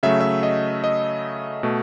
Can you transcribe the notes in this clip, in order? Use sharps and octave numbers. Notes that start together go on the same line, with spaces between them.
C#3 F#3 A3 E5
E5
D#5
D#5
B2 A3